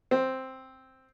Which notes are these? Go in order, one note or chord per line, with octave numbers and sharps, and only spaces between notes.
C4